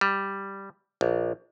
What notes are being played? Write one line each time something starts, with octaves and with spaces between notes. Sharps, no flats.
G3
A#1